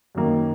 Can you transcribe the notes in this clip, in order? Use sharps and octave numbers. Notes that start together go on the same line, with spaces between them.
F#2 D#3 A#3